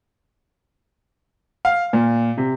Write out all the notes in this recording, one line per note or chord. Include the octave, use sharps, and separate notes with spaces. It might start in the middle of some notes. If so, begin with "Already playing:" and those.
F5
A#2
C3